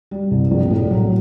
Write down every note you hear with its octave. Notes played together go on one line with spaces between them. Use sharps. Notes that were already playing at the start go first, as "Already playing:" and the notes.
G3
C2
A#1
A2
F#3